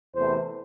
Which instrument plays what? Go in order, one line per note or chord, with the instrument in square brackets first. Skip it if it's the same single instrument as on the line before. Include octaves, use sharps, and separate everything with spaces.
[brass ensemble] E2 C3 E3 A3 C5